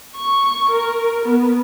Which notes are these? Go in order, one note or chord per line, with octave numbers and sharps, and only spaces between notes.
C#6
A#4
B3